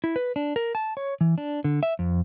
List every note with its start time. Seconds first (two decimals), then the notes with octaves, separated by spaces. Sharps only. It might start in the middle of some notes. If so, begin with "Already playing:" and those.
0.04 E4
0.16 B4
0.36 D4
0.56 A#4
0.75 A5
0.97 C#5
1.21 E3
1.38 D4
1.64 D3
1.83 E5
1.99 F2